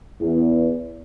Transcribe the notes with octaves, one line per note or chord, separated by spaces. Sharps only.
E2